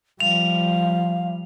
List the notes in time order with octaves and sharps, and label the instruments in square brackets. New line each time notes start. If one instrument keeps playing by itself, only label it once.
[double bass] F3 G3 [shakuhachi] F5 [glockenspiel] F7